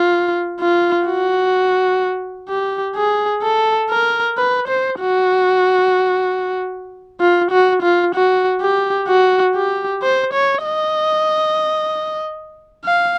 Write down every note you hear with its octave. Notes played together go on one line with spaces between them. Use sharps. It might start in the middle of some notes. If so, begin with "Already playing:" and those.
Already playing: F4
F4
F#4
G4
G#4
A4
A#4
B4
C5
F#4
F4
F#4
F4
F#4
G4
F#4
G4
C5
C#5
D#5
F5